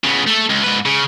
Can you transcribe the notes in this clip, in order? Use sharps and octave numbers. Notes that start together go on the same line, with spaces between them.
C#3 B3
A3 A4
C#2
G#2 B4
C#3